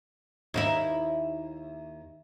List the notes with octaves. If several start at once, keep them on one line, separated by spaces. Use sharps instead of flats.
D#2 D#4 E4